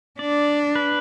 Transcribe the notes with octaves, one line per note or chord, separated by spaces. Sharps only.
D4 D5
B4